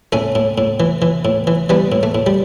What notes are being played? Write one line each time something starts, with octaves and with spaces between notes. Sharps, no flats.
A2 A3 C#4
A2
A2
E3
E3
A2
E3
E3 G3 B3
A2
A3
A2
G3